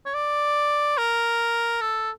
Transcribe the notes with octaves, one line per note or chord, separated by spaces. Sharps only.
C#5
D5
A#4
A4